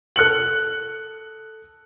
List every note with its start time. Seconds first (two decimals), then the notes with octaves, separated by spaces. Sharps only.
0.16 A4 F#6 C#7 F#7